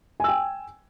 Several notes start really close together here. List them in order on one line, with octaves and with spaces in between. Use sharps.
G#5 E6 G5